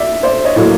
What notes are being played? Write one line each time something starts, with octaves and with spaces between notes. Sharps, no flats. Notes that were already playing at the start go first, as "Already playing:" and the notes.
Already playing: D5 E5
C5 D5
C#5 D#5
A2 F#3 A#3